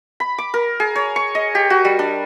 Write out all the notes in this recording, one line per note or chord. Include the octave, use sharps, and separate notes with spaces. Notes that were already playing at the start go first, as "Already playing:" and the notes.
B5
D6
A#4
G#4
C#5
C#6
D#5
G4
F#4
G3
D4